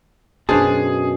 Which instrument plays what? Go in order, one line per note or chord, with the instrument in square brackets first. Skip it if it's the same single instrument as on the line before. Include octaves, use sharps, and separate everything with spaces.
[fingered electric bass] F#2 B2 [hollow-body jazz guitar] D4 C5 A5 [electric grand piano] G#4